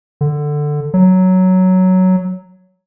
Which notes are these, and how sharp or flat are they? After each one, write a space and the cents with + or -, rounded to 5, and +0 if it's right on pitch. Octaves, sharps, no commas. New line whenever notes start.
D3 +10
F#3 +5